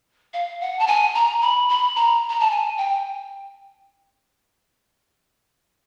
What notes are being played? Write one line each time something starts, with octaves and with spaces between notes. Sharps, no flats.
F5
F#5
A5
G#5
A#5
B5
B5
A#5
A#5
A5
G#5
G5